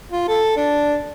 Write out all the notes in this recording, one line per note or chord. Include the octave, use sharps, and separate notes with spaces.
F4
A4
D4